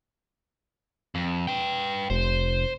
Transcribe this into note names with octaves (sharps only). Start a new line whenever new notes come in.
F2
B4 G5
F1 C5